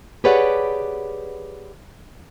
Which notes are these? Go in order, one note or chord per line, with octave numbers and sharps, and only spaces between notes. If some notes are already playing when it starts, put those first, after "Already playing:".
G4 G#4 B4 C#5 D5 F#5